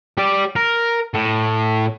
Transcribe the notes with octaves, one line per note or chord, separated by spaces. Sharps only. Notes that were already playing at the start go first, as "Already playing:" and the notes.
G4 D5
A#4
A2